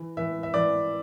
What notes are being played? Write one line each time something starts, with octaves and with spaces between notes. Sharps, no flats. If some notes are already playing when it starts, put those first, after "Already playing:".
Already playing: E3
E3 E5
E5
E3 D5